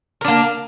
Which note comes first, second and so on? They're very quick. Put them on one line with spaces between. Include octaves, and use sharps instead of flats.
A#4 D4 A#3